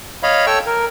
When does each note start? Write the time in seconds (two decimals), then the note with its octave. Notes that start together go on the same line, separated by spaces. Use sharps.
0.23 C#5 D#5 F5 B5
0.47 A4 C#5 G5 C#6 E6
0.66 A#4